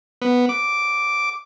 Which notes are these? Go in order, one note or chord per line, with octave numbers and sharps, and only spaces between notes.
B3
D6